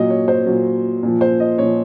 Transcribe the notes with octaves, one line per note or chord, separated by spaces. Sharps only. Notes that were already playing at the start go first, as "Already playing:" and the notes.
Already playing: A#2 F#3 D#5
C#5
C5
A#2 F#3
A#2 F3
C5
D#5
A#2 F3 C#5